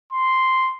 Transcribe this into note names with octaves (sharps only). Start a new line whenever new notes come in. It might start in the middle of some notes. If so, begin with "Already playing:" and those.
C6